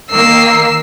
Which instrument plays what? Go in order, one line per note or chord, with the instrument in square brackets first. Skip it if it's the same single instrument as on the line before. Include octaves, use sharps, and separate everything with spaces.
[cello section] D#3 A#3 [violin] E6 C7